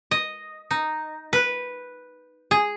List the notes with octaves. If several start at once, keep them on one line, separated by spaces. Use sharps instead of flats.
D#5
D#4
B4
G#4